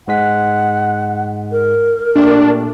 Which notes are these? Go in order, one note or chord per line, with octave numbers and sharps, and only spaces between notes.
G#2 G#3 F#5 B6
A#4
A#2 A3 D4 G4